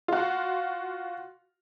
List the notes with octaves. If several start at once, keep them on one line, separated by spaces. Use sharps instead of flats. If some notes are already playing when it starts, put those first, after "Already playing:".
F4 F#4